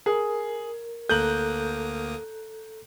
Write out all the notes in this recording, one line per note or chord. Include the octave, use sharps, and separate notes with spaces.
G#4 A#4
D2 A#3 A4 A#5 D#6 F#6 G6 F#7